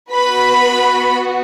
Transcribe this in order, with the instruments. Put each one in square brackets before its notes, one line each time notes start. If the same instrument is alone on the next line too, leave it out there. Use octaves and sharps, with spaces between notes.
[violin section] B3 F#4 B4 B5